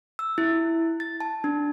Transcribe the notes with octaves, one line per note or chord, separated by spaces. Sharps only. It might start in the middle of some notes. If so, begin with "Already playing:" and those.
E6
E4
A6
A5
D4